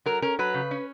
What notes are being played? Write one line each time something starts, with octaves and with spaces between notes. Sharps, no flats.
F#3 A#4
C#4 A#4
F#3 B4
C#3
C#4